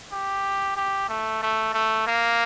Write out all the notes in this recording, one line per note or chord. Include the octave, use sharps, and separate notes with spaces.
G4
G4
A3
A3
A3
A#3